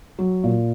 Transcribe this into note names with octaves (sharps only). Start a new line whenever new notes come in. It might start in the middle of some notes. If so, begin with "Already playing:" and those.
F#3
A#2